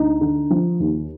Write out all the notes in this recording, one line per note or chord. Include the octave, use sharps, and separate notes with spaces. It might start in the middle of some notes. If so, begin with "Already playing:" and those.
Already playing: D2 D#4
D3
F3
D#2